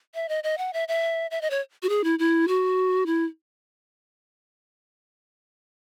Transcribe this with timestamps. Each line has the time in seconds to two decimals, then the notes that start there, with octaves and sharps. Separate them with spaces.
0.15 E5
0.29 D#5
0.44 D#5
0.58 F#5
0.73 E5
0.88 E5
1.31 E5
1.42 D#5
1.50 C#5
1.83 F#4
1.89 G#4
2.04 E4
2.19 E4
2.48 F#4
3.06 E4